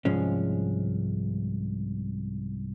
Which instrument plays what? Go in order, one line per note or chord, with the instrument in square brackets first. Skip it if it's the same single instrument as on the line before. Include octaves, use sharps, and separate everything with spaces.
[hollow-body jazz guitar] C2 G#2 F3 G#3 C#4